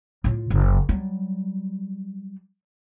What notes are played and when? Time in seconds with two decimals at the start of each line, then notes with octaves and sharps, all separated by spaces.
0.24 A2 F4
0.50 F#1
0.89 F#3 G3